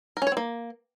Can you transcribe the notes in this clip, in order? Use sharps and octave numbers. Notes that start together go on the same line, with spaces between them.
A#4
C#4
C#5
C4
A#3